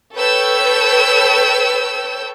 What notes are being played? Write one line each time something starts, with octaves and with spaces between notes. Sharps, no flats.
A4 B4 C#5 G5 E6 G6